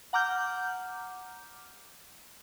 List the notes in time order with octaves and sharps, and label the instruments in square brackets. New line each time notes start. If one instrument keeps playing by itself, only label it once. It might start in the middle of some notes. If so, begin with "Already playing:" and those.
[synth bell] F#5 A#5 D6 F6 G6